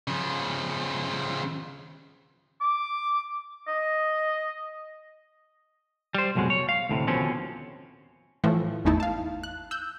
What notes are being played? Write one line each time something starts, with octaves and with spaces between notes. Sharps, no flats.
C#3 F3
D6
D#5
G3 C5
C2 F2 B2 F#3 G#3
C#5
F5
D2 A2 C3
D#2 B2 D3 F3 C4 C#4
A2 E3 F3 A3
G#1 E2 A3 D#4 E4 A5
F5 A5
F#6
E6 F#6 G6